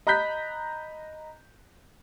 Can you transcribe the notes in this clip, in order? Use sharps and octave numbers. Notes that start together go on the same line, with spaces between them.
D#5 A#5 B5 F#6 G6 B6